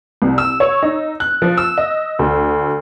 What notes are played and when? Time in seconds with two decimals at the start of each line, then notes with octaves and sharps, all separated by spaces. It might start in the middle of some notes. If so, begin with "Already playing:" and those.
0.22 C2
0.38 E6
0.60 C#5
0.83 D#4
1.20 F#6
1.42 F3
1.58 E6
1.78 D#5
2.19 D2